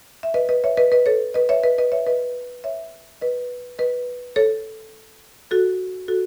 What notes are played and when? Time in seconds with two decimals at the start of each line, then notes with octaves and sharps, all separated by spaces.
0.23 E5
0.34 B4 D#5
0.49 B4 D#5
0.64 C#5 E5
0.77 B4 D#5
0.92 B4 D#5
1.06 A4 C#5
1.34 B4 D#5
1.49 C#5 E5
1.63 B4 D#5
1.78 B4 D#5
1.92 C#5 E5
2.07 B4 D#5
2.64 C#5 E5
3.21 B4 D#5
3.79 B4 D#5
4.36 A4 C#5
5.51 F#4 A4
6.08 F#4 A4